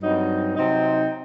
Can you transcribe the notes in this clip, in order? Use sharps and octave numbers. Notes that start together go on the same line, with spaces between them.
G2 F#3 C4 D#4
C3 F#3 C4 D#4